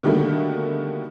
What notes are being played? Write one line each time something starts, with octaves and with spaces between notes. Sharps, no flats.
B2 D3 D#3 G3 A3 A#3